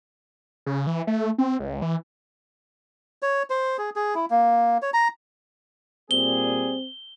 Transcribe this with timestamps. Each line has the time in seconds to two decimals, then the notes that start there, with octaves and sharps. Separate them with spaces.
0.66 C#3
0.87 E3
1.07 A3
1.38 C4
1.59 C#2
1.82 E3
3.22 C#5
3.50 C5
3.78 G#4
3.96 G#4
4.15 E4
4.30 A#3
4.82 C#5
4.94 A#5
6.11 A#2 G3 C4 G#4 G7